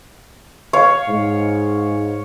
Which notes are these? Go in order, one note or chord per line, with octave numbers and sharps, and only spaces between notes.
C#5 F5
G#2